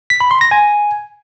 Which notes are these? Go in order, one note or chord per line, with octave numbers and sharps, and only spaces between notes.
B6
B5
C6
A#6
G#5